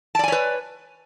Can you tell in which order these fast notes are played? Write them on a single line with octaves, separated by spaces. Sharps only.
A5 D5 G#5 C#5 B4